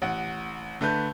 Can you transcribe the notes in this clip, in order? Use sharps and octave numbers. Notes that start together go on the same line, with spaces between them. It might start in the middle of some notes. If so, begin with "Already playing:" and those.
A1 F#5
D3 A3 B4 G6